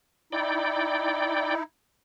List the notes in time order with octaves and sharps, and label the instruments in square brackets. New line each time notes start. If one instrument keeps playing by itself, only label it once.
[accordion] D#4 E4 [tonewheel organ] D5 G5